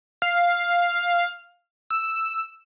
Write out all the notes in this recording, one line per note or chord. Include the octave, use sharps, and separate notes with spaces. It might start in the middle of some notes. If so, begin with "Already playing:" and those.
F5
E6